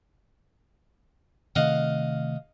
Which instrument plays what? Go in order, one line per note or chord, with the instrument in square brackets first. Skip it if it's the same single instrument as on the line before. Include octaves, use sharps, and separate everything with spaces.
[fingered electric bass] C3 D#3 A3 [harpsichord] D#5 F5 F#5